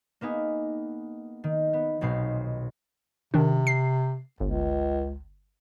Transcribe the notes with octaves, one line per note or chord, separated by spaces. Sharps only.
A#3 B3 D#4 G#4
D#3
B3
D#1 B1 B2 C4 C7
C3 D#3 D4
C7
G1 C#2